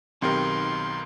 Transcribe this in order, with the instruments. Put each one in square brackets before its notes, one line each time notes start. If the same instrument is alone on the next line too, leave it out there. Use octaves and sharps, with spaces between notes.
[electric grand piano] B1 D#3 A#4 [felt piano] C4 G4 G5 [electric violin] C6